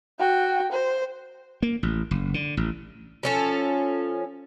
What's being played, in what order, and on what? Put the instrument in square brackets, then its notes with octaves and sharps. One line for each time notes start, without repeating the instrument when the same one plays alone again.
[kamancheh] F#4 G5
C5
[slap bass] A#3
A1
F#1
D3
A1
[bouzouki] F3 C#4 A4